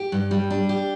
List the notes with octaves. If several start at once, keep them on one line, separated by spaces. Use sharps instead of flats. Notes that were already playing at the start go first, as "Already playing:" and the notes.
Already playing: G4
G2
G3
D4
G4